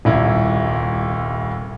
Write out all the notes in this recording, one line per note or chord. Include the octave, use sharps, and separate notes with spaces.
D#1 C2 E4